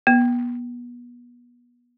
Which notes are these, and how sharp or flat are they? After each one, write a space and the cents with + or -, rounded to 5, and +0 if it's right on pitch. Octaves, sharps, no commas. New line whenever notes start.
B3 -30